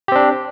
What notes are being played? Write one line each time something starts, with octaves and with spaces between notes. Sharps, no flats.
C4 D4 G4